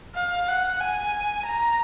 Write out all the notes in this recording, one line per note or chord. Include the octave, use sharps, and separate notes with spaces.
F5
F#5
G#5
A#5